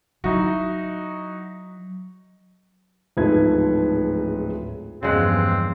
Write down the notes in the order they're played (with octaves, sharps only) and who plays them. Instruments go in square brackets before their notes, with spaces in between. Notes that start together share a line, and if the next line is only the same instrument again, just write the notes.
[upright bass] F#3 [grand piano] D#4 E4 F#4
[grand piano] D1 G#2 F3 A3 B4 G#6
[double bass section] E2 G2 F3 [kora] C#3 G#3 F#5 [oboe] C4